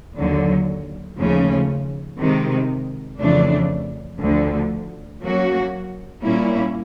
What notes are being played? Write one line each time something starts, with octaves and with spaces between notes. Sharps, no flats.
D#2 D3 F#3
D#2 C#3 F3 A3 C#4
C3 D#3 G#3
F2 C#3 E3 A3 D4
D2 D3 F3 A3
F#3 A#3 C#4 F#4
A#2 G3 A#3 C#4 E4